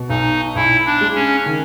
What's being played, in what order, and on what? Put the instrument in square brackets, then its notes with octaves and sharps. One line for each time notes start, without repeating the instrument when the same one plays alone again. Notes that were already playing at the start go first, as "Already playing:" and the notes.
Already playing: [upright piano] B2
[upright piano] B1 [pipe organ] D#4
[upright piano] B1 [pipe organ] E4
[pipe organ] D4
[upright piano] G#3
[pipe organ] C#4
[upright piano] D#3